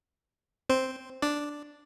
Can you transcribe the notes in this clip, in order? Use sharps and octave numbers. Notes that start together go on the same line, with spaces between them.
C4 C5
D4 D5